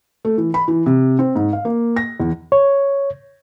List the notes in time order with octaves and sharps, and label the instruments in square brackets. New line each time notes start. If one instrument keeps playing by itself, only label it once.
[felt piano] A3
E3
B5
E3
C3
C4
G#2
F5
A#3
A#6
E2
[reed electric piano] C#5